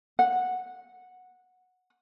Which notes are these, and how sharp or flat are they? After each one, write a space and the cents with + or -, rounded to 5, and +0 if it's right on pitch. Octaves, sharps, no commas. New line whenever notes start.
F#5 -10